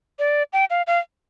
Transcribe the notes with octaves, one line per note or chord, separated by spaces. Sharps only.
D5
G5
F5
F5